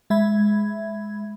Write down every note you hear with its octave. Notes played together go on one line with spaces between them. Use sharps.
G#3 E5 B5 G#6